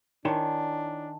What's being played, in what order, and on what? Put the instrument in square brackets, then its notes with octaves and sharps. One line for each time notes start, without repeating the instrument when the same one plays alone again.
[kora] D#3 [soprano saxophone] D4 [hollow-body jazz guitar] E4 C#5 C6 [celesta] G#5 A5